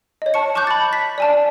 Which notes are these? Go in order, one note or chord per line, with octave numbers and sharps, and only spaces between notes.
C#5 D#5
A5 C#6 C#7
A5 C#6 D6 F#6 G6
B5 A6
B6
D5 G#5 A5